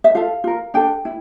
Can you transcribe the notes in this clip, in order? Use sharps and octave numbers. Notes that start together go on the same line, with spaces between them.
E5
F4 A4 F5
F4 A#4
D4 A4 G5
E4